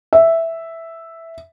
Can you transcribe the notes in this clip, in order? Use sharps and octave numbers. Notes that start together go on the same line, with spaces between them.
E5